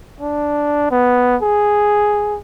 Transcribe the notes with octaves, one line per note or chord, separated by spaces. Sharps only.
D4
B3
G#4